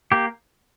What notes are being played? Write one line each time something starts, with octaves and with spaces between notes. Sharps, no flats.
A#3 G4